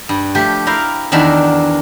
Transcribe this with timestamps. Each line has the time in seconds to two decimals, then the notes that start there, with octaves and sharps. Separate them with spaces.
0.09 G2
0.35 F3 A3 G4
0.67 E4 A#4 F5 G5
1.12 E2 D#3 D4 F#4 E5 A#5